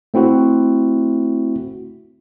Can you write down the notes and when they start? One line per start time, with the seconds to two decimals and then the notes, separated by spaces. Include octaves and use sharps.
0.14 A3 C4 E4 F#4